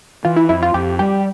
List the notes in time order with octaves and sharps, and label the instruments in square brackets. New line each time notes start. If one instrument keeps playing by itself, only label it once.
[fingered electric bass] E3 [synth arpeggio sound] F4
[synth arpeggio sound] E4
[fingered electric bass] F2 [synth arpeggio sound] E4
[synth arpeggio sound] F4
[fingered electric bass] F2 [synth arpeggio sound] G4
[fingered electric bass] G3 [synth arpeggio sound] G4